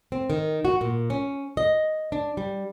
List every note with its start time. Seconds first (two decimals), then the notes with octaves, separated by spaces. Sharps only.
0.12 C4
0.30 D#3
0.65 F#4
0.81 A#2
1.10 C#4
1.57 D#5
2.12 D4
2.37 G3